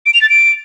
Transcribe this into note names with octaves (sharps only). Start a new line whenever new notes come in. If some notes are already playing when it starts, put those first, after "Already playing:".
D7
F7
A6
D7